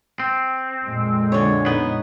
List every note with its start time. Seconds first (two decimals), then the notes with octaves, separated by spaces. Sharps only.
0.20 C4
0.84 F2 A#2 G#3
1.32 D3 C#5
1.66 B3 D#4